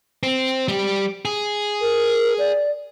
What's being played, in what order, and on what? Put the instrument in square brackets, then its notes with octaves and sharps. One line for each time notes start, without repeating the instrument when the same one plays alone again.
[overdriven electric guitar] C4
G3 G4
G#4
[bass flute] A#4
D5